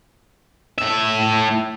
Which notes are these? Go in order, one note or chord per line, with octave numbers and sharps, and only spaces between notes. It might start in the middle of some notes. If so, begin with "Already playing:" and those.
A2 E5